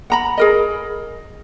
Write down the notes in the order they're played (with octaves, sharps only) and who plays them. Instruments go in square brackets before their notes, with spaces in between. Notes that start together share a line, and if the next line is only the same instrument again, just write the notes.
[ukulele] F#5 A#5 B5
G#4 A#4 D#5